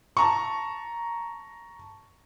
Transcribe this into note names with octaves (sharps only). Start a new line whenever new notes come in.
A5 A#5 C#6